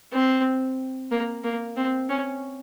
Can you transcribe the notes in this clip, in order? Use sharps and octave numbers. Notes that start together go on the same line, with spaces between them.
C4
A#3
A#3
C4
C#4